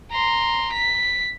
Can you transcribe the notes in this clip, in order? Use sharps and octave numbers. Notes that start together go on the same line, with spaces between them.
A#5 C6
B6